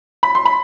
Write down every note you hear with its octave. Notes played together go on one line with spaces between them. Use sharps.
B5
C6
B5